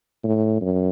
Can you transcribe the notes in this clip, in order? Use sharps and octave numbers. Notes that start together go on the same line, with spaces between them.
A2
F#2